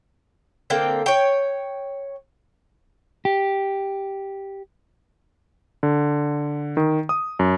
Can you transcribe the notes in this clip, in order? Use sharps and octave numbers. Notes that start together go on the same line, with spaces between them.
D3 A#3 C4 G5
C#5 G5
G4
D3
D#3
D#6
F#2